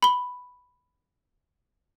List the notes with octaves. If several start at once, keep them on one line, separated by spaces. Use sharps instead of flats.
B5 G7